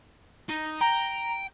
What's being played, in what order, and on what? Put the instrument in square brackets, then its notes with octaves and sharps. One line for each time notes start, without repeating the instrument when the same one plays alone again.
[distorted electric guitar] D#4
[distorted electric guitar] G5 [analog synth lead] A#5